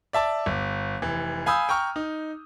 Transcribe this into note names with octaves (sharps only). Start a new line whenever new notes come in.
D5 E5 A5 D6
G1
F1 E3
F5 G#5 B5 D#6 E6 G6
G5 A#5 C#6 F6
D#4